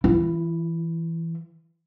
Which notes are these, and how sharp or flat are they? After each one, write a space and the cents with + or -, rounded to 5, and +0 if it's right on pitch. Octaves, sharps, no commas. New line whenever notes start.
E3 +0 E4 +40